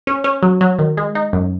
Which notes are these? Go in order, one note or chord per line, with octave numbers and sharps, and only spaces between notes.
C#4
C#4
F#3
F#3
D#3
G#3
D#4
F#2